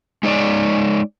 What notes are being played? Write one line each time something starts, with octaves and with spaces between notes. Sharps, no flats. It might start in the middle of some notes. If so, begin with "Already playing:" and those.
G#3 D#4 C#5 D5